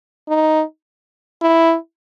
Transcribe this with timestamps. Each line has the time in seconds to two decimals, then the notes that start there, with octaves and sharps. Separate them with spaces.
0.29 D#4
1.42 E4